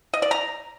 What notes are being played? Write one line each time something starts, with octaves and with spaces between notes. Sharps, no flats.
D#5
D5
A#5